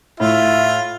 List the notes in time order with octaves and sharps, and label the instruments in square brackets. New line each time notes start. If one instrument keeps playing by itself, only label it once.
[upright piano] A2 [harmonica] F4 [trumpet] E5